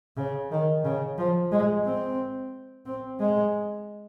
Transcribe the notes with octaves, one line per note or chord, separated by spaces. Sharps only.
C#3
D#3
C#3
F3
G#3
C4
C4
G#3